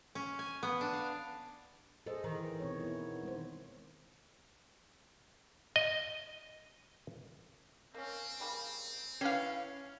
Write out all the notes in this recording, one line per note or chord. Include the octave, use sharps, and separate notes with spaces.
C#4
G#5
B3
D4
F5
G#4 A4 C5 D#5
D#3 E3
B2 C4 C#5
B3 E4
G#3 D#4 C5
D#5
A#3 C4 C#4
C#3 G3 A#3
C#4 E4 B4 F5 G5 C7